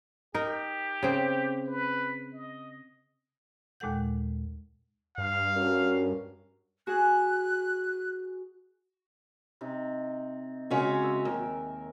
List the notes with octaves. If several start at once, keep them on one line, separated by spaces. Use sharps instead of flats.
D#4 G4 A#4
C#3 C4
B4
D#5
D#2 A#2 G#3 A4 F#5 G6
G2 F5
C#4 F#4 A#4
F#4 G#4 F#6
C3 D#4
C#3 G#3 C#4 F#4 G#4
A#4 E5
D#2 A#4